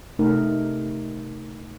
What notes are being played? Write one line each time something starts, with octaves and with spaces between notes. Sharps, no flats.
C3 A3 D#4 A#4